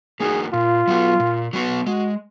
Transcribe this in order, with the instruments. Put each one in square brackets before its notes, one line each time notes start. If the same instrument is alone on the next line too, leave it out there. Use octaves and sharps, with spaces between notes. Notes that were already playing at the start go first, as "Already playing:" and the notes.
[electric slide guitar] A#3 D#4 F#4 [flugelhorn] G#4
[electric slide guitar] A#2 [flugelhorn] F4
[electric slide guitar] F#3 B3 F#4
A#2
F#3 B3 F#4
[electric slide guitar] G#3 [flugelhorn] F#4